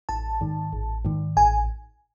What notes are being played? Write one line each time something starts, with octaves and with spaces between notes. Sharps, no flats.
A1 A5
G#2 D#3
A1
G#2 D#3
A1 G#5